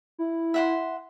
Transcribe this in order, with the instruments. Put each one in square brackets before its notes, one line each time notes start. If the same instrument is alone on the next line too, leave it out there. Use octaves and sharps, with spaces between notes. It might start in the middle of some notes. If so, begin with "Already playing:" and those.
[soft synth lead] E4
[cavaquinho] E5 F#5 C6